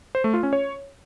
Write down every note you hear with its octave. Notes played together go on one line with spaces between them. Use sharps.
C5
A3
F4
C#4
C#5